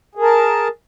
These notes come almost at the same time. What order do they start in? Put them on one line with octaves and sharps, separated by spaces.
G#4 A#4 A5